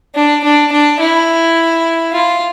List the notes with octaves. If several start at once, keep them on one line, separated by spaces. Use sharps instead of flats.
D4
D4
D4
E4
F4